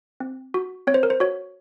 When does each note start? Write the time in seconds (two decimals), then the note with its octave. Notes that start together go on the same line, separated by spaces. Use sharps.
0.20 C4
0.54 F#4
0.87 C4 C#5
0.94 C5
1.03 A#4
1.10 C5
1.20 F#4 C#5